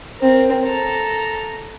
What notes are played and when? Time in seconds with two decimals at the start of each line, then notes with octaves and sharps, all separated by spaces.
0.19 C4 A#4
0.64 A4 A#5